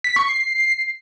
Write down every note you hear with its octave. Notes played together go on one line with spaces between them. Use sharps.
B6
C#6
C7